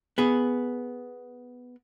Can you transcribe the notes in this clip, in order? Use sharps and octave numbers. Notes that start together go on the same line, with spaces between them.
B3 G#4